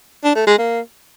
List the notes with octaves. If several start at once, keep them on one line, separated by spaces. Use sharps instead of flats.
D4
A3
G#3
A#3